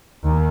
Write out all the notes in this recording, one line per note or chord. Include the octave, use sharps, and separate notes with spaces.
D#2